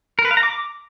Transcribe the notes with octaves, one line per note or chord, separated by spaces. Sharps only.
A#4
B4
F5
A#5
D6